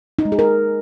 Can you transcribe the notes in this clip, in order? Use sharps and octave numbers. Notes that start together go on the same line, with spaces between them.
D#4
G#3
G#4
A#4